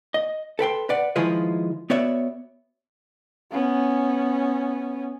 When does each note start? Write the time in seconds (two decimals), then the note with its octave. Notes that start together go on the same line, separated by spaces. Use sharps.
0.14 D#5
0.59 A4 B4 G5 C6
0.89 B4 D5 F#5
1.16 D#3 F3 G#3 E4 F4 B4
1.90 B3 F#4 C#5 D5 E5
3.51 B3 C#4